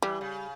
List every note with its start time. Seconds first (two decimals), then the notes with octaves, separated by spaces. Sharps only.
0.02 E3 G3
0.21 C#3